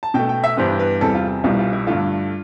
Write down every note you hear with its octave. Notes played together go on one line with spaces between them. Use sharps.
A5
B2 A3 G5
G5
E5
G2 E3 G3 B3 C5
B4
E2 C3 G3 A4
F4
C2 B2 G3 F4
F4
E4
G2 D3 A3 F4